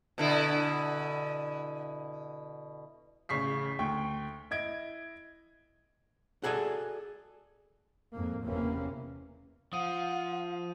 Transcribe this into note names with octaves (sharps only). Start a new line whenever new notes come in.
B2 D3 E4
A1 C#3 C#6 B6 C7
D2 G5 C#6
E4 D#5 G#6 D7
F#4 G#4 A4 D5 G#5
F2 G#2 A#3
F#1 E2 C3 E3 A#3 C#4
F3 F5 F#5 D#6 D#7